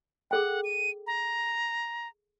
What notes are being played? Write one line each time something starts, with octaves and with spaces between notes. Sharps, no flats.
G#4 A4 F#5 G5
D#7
A#5